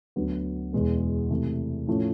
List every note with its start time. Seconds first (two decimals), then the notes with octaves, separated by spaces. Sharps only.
0.16 D2 D3 F#3 B3
0.73 E2 B2 G#3 B3
1.30 C3 E3 A3
1.87 A2 F3 A3 C#4